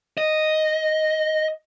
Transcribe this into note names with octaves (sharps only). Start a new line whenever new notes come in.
D#5